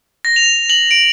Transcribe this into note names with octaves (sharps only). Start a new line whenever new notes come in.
A#6
F7
F#7
D7